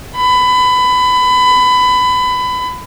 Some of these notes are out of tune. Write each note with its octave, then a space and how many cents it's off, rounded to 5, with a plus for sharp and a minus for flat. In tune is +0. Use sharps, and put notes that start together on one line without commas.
B5 +25